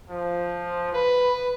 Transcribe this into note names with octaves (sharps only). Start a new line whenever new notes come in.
F3
B4